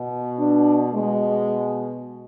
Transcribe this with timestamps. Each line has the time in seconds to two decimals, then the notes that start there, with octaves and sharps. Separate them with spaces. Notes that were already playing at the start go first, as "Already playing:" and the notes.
Already playing: B2
0.39 D4
0.94 B2 G#3